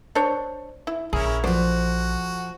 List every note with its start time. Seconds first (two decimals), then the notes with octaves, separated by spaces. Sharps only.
0.15 D4 C5 C#5
0.87 E4
1.13 A#1 C#4 E4 G#4 A#4
1.44 F3 A3 F#4 C5 D5